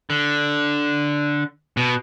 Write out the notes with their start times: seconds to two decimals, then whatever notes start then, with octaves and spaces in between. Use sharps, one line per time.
0.10 D3
1.77 B2